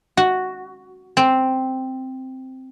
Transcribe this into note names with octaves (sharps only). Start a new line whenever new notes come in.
F#4
C4